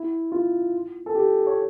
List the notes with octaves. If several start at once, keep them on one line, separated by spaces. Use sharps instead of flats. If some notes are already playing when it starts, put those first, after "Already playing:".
Already playing: E4
F4
A4
G4
C#5